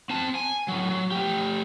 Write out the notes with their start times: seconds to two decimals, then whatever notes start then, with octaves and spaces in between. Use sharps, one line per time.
0.10 C4 A5
0.35 G#5
0.68 A2 F#3
0.90 F#3
1.11 A3 G4